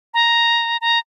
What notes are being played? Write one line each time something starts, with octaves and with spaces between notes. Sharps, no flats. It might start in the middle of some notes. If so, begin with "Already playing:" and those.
A#5
A#5